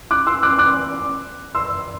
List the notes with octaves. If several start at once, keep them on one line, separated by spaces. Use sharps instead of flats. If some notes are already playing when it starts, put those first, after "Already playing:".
D6 F#6
C6 E6
D6 F#6
D6 F#6
C6 E6